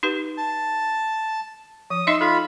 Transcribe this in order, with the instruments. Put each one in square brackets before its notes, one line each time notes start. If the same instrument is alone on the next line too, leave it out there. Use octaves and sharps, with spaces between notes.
[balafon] D#4 G4 B4
[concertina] A5
[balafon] F3 [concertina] D#6
[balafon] D#4 D#5 E5 [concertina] C6 E6
[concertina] F4 B5 [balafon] A4